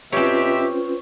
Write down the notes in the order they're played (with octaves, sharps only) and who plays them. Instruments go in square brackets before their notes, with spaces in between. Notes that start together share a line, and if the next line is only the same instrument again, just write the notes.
[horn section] B2 G4 E5 [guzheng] C4 C#5 [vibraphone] C#4 F4 B4